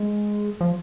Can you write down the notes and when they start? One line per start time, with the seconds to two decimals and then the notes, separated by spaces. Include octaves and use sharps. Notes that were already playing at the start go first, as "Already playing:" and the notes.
Already playing: G#3
0.61 F3